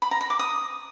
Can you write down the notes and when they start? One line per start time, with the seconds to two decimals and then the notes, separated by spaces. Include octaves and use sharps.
0.02 B5
0.11 A#5
0.21 B5
0.30 D6
0.39 D#6